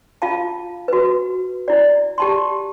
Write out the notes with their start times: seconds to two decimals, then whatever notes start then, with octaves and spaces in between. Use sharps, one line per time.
0.22 F4 F5 A5
0.88 F#4 B4
1.68 E4 D5
2.18 G4 A5 C6